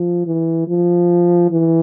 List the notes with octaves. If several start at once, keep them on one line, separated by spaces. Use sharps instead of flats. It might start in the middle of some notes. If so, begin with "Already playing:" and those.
Already playing: F3
E3
F3
E3